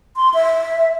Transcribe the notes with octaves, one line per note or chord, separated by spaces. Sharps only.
C6
E5